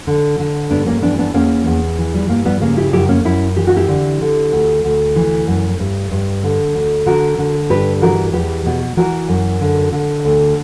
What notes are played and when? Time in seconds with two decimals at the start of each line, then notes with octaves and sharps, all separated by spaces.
0.07 D3
0.39 D3
0.70 G2 B3 D4
0.86 A#3 C#4
1.02 E3 B3 D4
1.19 B3 D4
1.34 E2 A#3 C#4
1.66 E2
1.98 E3
2.14 G3
2.29 G2 A#3
2.45 G3 B3
2.61 C#3 A#3
2.77 E4 G4
2.93 F#2 E4 G4
3.09 A#3 C#4
3.24 F#2 C#4 E4
3.56 E3 G4
3.67 F#4
3.77 E4 G4
3.88 D3
4.21 D3
4.52 D2
4.84 D2
5.16 E3
5.48 F#2
5.80 G2
6.12 G2
6.43 D3
6.75 D2
7.06 D3 F#4 A#4
7.38 D3
7.70 G2 G4 B4
8.02 E3 F#4 A#4
8.33 E2 G4 B4
8.66 B2
8.97 E3 F#4 A#4
9.29 F#2
9.61 D3
9.92 D3
10.25 D2